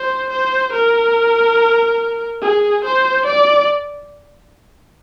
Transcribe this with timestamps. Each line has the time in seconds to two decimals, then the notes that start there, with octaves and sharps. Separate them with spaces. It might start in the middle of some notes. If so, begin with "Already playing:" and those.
Already playing: C5
0.29 C5
0.72 A#4
2.42 G#4
2.84 C5
3.26 D5